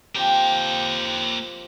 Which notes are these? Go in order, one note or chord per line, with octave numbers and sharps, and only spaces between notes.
F3 A#3 C4 G4 G5